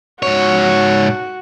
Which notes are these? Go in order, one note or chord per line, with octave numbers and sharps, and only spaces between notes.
G#2 F#4 C#5